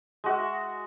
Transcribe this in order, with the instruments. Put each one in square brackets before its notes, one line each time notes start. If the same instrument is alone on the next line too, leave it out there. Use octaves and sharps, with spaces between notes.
[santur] G#3 F#4 E5